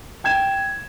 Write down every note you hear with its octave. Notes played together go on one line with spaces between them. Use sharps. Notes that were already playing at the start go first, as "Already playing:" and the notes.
G5 G#6 E7